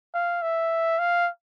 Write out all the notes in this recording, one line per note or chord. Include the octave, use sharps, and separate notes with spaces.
F5
E5
F5